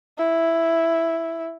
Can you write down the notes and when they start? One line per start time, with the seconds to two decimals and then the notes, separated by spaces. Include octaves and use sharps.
0.18 E4